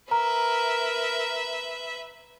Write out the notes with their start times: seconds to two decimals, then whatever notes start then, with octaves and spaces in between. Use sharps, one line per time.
0.11 A#4 B4 E5 A#5